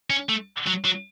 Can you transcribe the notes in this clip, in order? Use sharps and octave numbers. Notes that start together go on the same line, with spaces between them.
C#4
A3
F#3
F#3